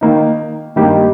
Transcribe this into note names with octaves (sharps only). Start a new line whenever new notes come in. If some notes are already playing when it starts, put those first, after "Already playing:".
D#3 A#3 D#4
G2 D#3 A#3 D#4 G4